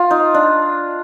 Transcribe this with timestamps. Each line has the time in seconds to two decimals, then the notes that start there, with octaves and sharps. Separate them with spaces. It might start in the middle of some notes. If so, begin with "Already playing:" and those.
Already playing: F4
0.11 D#4
0.34 D4